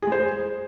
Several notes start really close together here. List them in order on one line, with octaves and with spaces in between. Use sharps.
G#4 G#3 C5